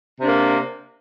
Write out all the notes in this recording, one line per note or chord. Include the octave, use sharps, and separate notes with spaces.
C3 A#3 D4